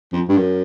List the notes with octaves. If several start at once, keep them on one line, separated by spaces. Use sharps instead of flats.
F2
G2
F#2